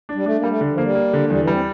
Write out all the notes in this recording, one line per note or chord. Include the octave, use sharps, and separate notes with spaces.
D4
G3
A3 D4
A#3
G3
A3
D3
F3
A#3
G3
A#3
D3
E2 G3
E3
G3
C4